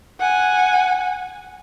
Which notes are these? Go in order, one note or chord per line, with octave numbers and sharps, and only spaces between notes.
F#5 G#5